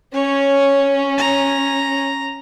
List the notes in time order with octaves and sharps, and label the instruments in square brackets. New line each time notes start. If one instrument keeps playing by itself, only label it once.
[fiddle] C#4 [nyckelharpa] C#5
[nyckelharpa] A#5